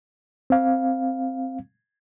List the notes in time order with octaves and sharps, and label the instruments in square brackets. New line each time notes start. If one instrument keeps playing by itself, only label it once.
[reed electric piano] C4 F5